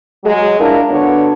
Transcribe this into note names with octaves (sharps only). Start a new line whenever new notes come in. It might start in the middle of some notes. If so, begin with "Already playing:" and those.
F#3 G#3
D4 E4 F4 A#4
D3 B3 D4 F#4 C#5